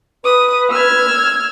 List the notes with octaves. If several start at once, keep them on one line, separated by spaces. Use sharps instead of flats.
B4 D#6
E6 F6 G#6